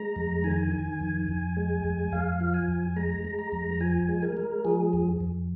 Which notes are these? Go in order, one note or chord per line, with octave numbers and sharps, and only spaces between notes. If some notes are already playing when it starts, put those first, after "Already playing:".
Already playing: G#3 A#5
F2
D#3 G#5
D#3
F2
F2
G#3
F2
F2 F5
F3
G#5
F2
G#3 A#5
G#3
A#5
F2
F3 G#5
G#3
A#4
G#3
F3 G#4
F2
F2